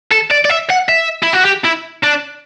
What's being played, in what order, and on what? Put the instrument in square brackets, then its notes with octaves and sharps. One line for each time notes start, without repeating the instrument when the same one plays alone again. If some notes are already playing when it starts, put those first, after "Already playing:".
[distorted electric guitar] A4
D5
D5
E5
F#5
E5
E4
F#4
G4
E4
D4